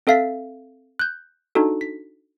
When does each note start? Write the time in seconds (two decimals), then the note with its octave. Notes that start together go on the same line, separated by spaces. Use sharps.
0.07 C4 A4 E5 F5 A6 B6
0.99 F#6 G6
1.55 D4 D#4 F#4 A4
1.81 B6